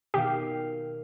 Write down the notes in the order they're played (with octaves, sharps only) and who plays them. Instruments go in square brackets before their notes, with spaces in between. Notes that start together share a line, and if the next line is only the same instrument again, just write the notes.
[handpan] B2 D#3 F5 [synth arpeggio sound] G4